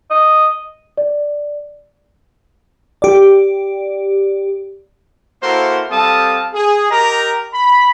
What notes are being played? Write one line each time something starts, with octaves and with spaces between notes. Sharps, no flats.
D#5
D5
G4 D5
A#3 E4 F#4 A4 A#4 C5
G3 C4 A4 F5 A5 D#6
G#4
G4 A#4 D#5 G5 A#5
B5